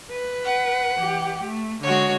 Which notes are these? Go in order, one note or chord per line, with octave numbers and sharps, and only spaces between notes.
B4
F#5
E3 G4
A3
D3 G#3 F#4 C#5